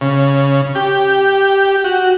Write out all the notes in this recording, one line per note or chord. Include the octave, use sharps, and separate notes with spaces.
C#3
G4
F#4